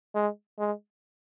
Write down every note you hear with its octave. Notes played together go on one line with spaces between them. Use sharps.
G#3
G#3